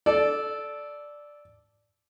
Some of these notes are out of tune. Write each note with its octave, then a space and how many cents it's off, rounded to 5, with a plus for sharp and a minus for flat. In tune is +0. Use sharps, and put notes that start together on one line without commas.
A4 -10 D5 +0